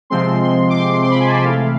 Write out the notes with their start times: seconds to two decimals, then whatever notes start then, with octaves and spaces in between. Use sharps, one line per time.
0.10 C3 F3 G#3 C4 C6
0.43 C6
0.69 D6
0.77 C6
0.93 C6
1.04 C6
1.10 B5
1.20 G#5
1.27 A5
1.44 C3 E3 A3 F5